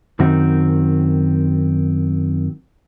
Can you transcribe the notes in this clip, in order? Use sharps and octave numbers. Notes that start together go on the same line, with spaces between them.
F#2 D#3 C4 F#4